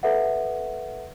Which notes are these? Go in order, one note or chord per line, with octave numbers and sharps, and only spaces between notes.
A4 B4 E5 F#5